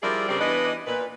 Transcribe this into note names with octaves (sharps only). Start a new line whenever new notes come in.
F3 G3 E4 G#4 A#4 D5
G2 C#3 G3 C4 A#4 D5
E3 B3 D4 B4 D#5
A#2 B4